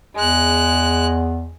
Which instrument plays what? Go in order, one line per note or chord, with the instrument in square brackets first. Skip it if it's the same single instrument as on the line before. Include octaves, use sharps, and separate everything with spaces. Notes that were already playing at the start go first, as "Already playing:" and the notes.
[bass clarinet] E2 [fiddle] G#3 F#6